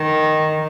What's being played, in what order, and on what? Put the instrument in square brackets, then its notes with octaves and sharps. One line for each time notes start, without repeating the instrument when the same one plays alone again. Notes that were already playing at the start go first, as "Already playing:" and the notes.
Already playing: [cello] D#3